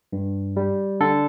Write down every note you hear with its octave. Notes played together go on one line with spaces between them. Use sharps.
G2
G3
D3 A4